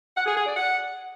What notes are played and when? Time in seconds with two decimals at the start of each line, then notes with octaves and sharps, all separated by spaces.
0.16 F#5
0.26 G#4
0.36 G#4
0.46 D5
0.56 F#5